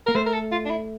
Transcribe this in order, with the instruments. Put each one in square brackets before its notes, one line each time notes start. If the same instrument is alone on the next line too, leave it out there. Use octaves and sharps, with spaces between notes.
[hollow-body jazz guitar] A#3 [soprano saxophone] A#4
[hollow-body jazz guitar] A3 [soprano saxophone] C5
[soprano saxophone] A#4
A4
F4
D4
E4